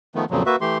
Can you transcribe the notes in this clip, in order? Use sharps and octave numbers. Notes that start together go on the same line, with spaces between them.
D#3 F3 A3 B3
F2 A#2 C#3 F3 F#3
A#3 F#4 B4 E5
E3 A3 G4 C6